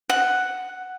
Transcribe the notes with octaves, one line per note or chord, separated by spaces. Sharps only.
F#5